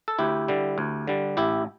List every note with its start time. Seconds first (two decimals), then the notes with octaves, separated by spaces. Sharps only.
0.08 A4
0.19 D2 E4 G4
0.48 D3 G3
0.78 D2
1.08 D3 G3
1.37 A1 E4 G4